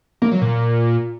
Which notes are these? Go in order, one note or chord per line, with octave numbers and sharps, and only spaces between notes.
A#3
F#3
A#2